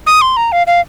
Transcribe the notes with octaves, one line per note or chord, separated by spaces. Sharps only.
D#6
C6
A#5
F5
F5